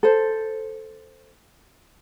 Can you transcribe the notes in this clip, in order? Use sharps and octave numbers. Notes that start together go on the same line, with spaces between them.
A4 C5